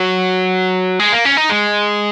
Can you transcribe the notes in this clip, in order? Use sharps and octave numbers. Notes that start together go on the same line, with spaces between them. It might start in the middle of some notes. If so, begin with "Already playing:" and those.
Already playing: F#3
G#3
A#3
C#4
D#4
G#3